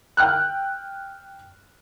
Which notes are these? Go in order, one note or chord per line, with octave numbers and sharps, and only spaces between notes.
G5 F6 F#6